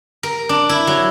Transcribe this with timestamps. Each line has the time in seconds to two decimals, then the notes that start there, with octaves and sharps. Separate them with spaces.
0.23 A#4
0.49 D4
0.69 E4
0.87 F#3